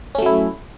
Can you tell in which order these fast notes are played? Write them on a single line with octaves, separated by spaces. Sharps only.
C#4 A3 F#3 E4